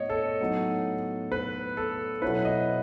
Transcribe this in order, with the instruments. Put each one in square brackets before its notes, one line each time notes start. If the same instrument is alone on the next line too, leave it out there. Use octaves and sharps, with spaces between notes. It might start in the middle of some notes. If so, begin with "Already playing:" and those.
Already playing: [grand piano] A2 B3 C#5 D#5
A4
A2 F#3 B3 D#4
B4
A4
B2 F#3 C#4 E4 B4
D#5